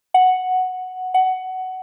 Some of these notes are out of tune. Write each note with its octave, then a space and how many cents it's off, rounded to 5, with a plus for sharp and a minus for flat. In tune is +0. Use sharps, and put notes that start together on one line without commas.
F#5 +0
F#5 +15